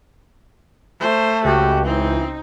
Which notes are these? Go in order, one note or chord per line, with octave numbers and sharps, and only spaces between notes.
A3 C5
C#2 F#4 G4
E3 C4 D#4